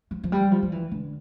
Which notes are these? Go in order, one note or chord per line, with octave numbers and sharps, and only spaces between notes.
F3
F3
G3
F3
F3
E3
D3